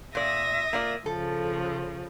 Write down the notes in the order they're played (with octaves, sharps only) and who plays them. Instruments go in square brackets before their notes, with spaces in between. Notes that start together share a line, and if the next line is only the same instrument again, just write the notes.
[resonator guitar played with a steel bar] A#2 D5 [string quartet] E5 D#6 A#6
[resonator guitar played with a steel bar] A#3 F4 D5
[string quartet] C#3 F3 [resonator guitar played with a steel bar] A4